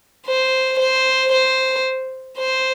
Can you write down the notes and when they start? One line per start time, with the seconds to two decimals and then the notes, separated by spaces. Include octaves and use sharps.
0.26 C5
0.79 C5
1.32 C5
2.38 C5